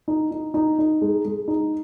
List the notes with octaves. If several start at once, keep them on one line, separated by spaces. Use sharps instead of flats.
D#4
D#4
D#4
D#4
G#3
G#3
D#4